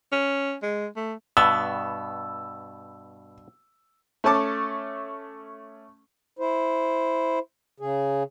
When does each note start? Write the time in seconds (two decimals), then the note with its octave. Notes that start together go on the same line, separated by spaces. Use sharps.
0.12 C#4
0.62 G#3
0.96 A3
1.37 G2 B2 B3 E6
4.24 A3 C#4 A5 D6
6.39 E4 C5
7.80 C#3 G#4